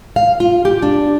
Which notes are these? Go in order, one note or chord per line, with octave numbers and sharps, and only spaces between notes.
F5
F4
G4
D4